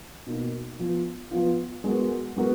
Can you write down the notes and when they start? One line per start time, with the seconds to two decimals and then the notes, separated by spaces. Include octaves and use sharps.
0.26 B2 A#3 D#4 F#4
0.79 F3 B3 F4
1.31 F3 B3 F4
1.84 G#3 B3 F#4 A#4
2.36 G#3 B3 F#4 A#4